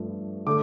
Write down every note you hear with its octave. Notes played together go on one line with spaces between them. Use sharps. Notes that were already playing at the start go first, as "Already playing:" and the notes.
Already playing: G2 F3 A3
D3 A3 D6